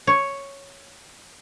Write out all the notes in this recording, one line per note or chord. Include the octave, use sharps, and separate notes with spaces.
C#5